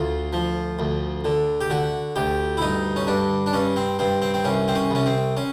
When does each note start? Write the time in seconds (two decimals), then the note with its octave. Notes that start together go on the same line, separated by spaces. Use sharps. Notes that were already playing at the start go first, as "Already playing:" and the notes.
Already playing: D2 F4
0.33 F3
0.79 D2
1.25 D3
1.61 G4
1.70 D3 F#4
2.16 D2 G4
2.57 E4
2.61 G2 D#4
2.96 C#4
3.07 G2 D4
3.46 D4
3.53 G2 C#4
3.76 C4
3.99 G2 C4
4.22 C4
4.34 C4
4.44 C2 C#4
4.68 C4
4.75 C#4
4.90 C2 C#4
5.06 C4
5.37 C#4